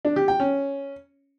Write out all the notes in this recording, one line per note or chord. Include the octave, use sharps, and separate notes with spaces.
D4
G4
G5
C#4